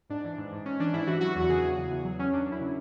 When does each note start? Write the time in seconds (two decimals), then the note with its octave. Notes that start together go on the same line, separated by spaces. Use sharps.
0.10 G#2 D4
0.24 E3
0.38 G#2
0.52 G#2
0.66 G#2 C#4
0.80 E3 D4
0.93 G#2 E4
1.07 E3 F#4
1.21 F#3 F#4
1.35 E2 F#4
1.49 C#3 G#4
1.63 E2
1.77 E2
1.91 E2
2.05 F#3
2.19 F#3 C#4
2.32 F#2 D4
2.47 F#2
2.52 E4
2.60 C#3